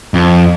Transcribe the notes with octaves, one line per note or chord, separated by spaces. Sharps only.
F2